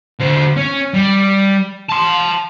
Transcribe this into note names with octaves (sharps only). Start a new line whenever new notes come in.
D3 C5
C#4
G3
A5 C6